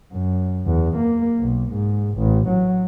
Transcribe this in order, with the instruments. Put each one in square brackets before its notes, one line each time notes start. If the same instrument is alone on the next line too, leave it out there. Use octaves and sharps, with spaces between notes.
[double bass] F#2
E2
A#3
B1
G#2
A1
F#3